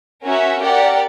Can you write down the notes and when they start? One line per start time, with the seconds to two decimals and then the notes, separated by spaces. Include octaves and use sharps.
0.24 C#4 F#4 A#4 C#5 E5
0.61 G4 A#4 D5 F#5